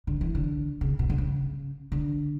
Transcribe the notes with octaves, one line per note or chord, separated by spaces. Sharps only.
D3
E3
D3
C#3
B2
D3
C#3
D3